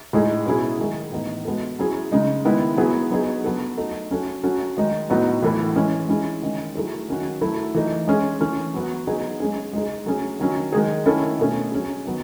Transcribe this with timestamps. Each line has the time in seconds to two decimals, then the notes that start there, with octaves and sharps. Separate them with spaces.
0.13 A2 G#3 D#4 G#4
0.46 B2 F#3 C#4 E4 G#4
0.79 D#3 G#3 D#4 G#4
1.12 A2 E3 B3 D#4
1.45 G#3 B3 F#4 A4
1.79 F#3 C#4 E4 G#4
2.12 C#3 G#3 D#4
2.45 D#3 G#3 B3 E4
2.77 F#3 B3 E4 G#4
3.11 F#3 B3 D#4 G#4
3.44 F#3 B3 F#4 A4
3.77 F#3 A3 D#4 A4
4.11 F#3 C#4 F#4 A4
4.43 F#3 C#4 F#4 A4
4.77 D#3 G#3 D#4
5.10 A2 F#3 B3 D#4 F#4
5.42 A2 E3 A3 E4 A4
5.76 E3 G#3 C#4
6.08 G#3 C#4 E4 G#4
6.42 D#3 G#3 C#4
6.75 F#3 A3 E4 G#4
7.09 D#3 F#3 C#4 F#4
7.41 F#3 A3 E4 A4
7.75 E3 A3 D#4
8.08 G#3 C#4 G#4
8.40 E3 A3 C#4
8.74 F#3 B3 F#4
9.07 F#3 B3 D#4 G#4
9.40 G#3 C#4 G#4
9.73 G#3 D#4 G#4
10.06 F#3 A3 C#4 G#4
10.40 D#3 F#3 C#4
10.73 D#3 G#3 D#4 G#4
11.06 D#3 A3 C#4 E4 A4
11.39 B2 A3 C#4
11.72 F#3 C#4 G#4
12.05 D#3 F#3 B3